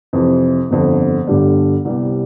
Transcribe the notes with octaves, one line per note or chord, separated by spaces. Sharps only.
F2 C3 E3
G1 F2 D3
G1 G2 D3 G3 D4
C2 C3 G3 B3